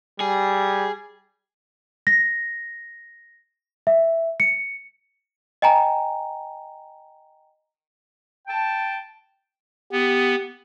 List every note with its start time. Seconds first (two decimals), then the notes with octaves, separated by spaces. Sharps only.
0.20 G3 G#4
2.07 A#6
3.87 E5
4.40 C#7
5.62 D#5 G5 G#5 A#5
8.48 G5 A5
9.92 B3 G4